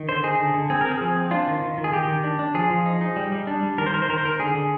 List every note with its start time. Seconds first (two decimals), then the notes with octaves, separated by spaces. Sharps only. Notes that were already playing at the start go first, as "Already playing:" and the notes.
Already playing: D#3
0.09 D3 C5
0.23 D#4 G#4
0.39 D3
0.54 D3
0.70 C4 G#4
0.81 C4 A#4
0.91 G#4
1.01 F3
1.17 C4
1.31 D4 F4
1.48 D#3
1.62 D#3
1.78 D#3
1.84 G#4
1.93 D#3 G4
2.08 D#3
2.24 D4
2.39 D4
2.54 F3 G#4
2.70 F3
2.86 D#4
3.01 D#4
3.16 G3
3.32 G3
3.47 D4
3.63 G3
3.78 D#3 A#4
3.86 C5
3.94 D#3 A#4
4.02 C5
4.09 D#3 A#4
4.18 C5
4.24 D#3 A#4
4.39 D3 G#4
4.55 D3